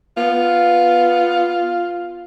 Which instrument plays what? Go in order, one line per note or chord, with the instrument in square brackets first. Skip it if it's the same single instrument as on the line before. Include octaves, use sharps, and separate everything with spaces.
[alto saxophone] B3 [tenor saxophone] F4